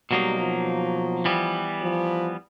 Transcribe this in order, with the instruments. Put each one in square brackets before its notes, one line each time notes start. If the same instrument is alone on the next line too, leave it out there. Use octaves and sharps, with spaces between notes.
[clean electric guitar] B2 F#3 A#3 D#4 [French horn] G3
[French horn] F3
[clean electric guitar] E3 G3 B3
[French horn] F3